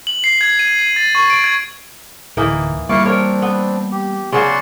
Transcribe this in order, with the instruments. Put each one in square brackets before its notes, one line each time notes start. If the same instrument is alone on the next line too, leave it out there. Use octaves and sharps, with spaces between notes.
[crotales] F#7
C7
G#6
D#7
D#7
A6
C#6
D7
G#6
[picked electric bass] D1 [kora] E3 A#3 D#4
[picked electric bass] G3 A#3 [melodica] E4 F5 C#6 [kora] D5
[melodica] C4 D4 [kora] A#4 C#5
[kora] B3
[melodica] G4
[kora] C#3 F#3 F#4 [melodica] D5 C6 C#6